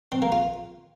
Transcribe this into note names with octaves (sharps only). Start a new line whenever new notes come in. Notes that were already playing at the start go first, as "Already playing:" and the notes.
C4
A#3
F4